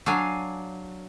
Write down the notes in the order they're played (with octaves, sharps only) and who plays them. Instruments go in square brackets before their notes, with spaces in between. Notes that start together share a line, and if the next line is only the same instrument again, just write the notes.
[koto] F#3 D4 F5 G#5